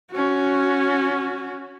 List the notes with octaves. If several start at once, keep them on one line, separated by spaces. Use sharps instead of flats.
C#4 F#4